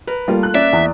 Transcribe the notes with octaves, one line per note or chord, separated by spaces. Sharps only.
A#4 B4
G3 A3 A#3 F4
F#6
A#3 C#4 D5 E5
E2